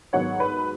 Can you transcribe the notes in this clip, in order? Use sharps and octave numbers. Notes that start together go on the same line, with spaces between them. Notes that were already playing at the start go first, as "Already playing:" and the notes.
G#2 D#3 F#3 B3 C#5 F#5
B4